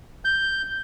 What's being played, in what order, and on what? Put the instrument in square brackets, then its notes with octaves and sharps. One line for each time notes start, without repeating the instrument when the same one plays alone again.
[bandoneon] G6